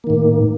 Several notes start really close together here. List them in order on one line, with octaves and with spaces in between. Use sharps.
A#3 D#3 A2